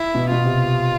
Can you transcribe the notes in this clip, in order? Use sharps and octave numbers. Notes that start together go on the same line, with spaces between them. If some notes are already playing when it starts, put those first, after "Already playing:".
Already playing: E4
B2
B2 F4
C3